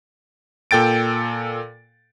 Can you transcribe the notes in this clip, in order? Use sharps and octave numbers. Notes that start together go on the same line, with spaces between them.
A#2 A4 G5 A6 D7